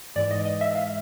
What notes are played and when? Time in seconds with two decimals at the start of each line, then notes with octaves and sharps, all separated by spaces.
0.16 G#2 E3 G#3 D5
0.31 D#5
0.45 D#5
0.61 E5
0.75 F5